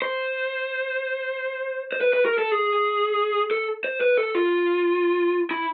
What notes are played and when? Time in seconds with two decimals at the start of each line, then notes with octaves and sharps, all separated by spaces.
0.02 C5
1.92 C5
2.01 B4
2.13 B4
2.26 A#4
2.39 A4
2.52 G#4
3.51 A4
3.84 C5
4.01 B4
4.18 A4
4.35 F4
5.51 E4